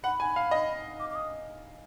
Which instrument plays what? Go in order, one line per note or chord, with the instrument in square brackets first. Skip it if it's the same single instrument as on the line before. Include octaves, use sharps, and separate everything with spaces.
[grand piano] F#5 [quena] B5
[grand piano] G#5
F5
D#5
[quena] D6
D6
D#6